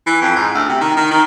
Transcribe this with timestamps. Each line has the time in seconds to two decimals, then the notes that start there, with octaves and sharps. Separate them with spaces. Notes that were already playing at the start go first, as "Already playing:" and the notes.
0.07 E3
0.22 F2
0.37 G#2
0.55 D2
0.69 C3
0.81 D#3
0.97 D#3
1.11 D#3